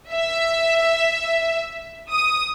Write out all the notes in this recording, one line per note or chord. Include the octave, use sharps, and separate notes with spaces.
E5
D#6